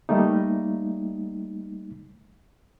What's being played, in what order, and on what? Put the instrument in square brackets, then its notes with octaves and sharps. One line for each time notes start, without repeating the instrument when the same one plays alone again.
[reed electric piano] G3 A3 A#3 D#4